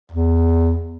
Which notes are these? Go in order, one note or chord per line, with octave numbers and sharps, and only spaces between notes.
E2